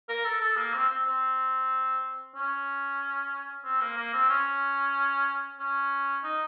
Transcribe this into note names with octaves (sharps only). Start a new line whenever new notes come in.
A#4
A4
A4
A#3
C4
C4
C4
C#4
C4
A#3
A#3
C4
C#4
C#4
D#4